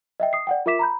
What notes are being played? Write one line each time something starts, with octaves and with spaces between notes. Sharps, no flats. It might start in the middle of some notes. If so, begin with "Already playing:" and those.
D#5 E5 G5
D#6 C7
D5 F#5 G5
F4 A#4 E5 D6 B6 E7
A#5 B5 G6